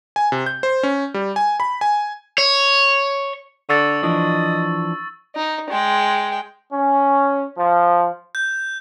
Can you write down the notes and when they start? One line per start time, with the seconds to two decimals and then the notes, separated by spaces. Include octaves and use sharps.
0.16 G#5
0.32 C3
0.46 G6
0.63 C5
0.83 C#4
1.14 G3
1.36 G#5
1.60 B5
1.81 G#5
2.38 C#5
3.69 D3 C#6 E6 A6
4.03 E3 F3 D4 D#5
5.35 D#4
5.69 G#3 G5
6.73 C#4
7.58 F3
8.35 G6